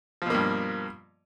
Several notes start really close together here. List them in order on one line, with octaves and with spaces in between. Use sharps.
F3 B2 A#3 G2